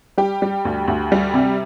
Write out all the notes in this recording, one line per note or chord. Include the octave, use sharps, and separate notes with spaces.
G3 G4
G3
D2
D2
G3
C3